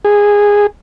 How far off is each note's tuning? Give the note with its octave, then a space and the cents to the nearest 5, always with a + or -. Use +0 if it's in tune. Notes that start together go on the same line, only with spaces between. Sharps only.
G#4 -15